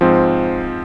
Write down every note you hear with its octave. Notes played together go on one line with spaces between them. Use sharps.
G#2 F3 C4